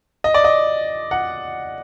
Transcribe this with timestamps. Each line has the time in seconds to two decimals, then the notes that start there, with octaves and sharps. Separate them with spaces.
0.24 D#5
0.34 D5
0.44 D#5
1.11 F#5